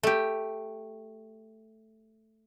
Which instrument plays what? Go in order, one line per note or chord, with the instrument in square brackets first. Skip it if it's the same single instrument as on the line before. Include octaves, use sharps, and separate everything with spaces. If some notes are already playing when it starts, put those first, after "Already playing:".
[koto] A3 G4